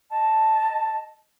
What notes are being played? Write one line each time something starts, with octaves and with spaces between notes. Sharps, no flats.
D#5 A5